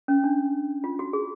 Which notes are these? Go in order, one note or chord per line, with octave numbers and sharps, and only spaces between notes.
C#4
D4
F4
F#4
G#4